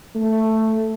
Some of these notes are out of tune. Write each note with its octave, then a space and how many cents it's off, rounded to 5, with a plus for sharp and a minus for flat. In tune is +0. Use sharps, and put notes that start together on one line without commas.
A3 +5